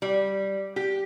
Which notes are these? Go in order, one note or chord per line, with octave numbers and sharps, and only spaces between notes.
G3
G4